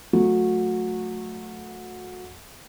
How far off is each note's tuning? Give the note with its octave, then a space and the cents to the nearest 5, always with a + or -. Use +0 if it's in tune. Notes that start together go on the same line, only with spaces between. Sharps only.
F#3 -25 A3 +0